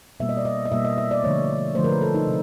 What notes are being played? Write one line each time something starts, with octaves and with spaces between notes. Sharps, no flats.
B2 G3 A#3 E5
D#5
D5
D#5
D#5
B2 G3 A#3 E5
D#5
E5
D5
D3 F3 A3 C#5
D3 F3 A3 C5
A#4
B4
A4
D#4
C3